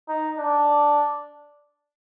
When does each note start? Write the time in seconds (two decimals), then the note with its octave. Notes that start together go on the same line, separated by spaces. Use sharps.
0.09 D#4
0.39 D4